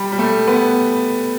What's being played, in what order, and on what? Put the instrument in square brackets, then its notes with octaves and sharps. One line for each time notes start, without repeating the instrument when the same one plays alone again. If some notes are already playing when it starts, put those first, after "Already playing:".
Already playing: [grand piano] G3
G3
A3
B3